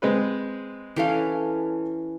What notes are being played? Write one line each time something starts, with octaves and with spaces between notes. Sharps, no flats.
G#3 C4 B4
E3 C#4 G4 A4 F5